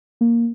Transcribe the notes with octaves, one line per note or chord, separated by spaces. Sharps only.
A#3